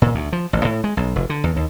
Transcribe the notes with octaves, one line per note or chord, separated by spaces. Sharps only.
A#2
D2
F3
A1
A2
G#3
B1
F1
D3
E2
D#2